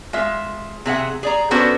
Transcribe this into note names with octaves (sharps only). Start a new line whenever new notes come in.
G#3 F4 E5
C3 G#4 E5 F#5
G#4 D5 A#5
B3 C#4 D4 F#4 A4 C5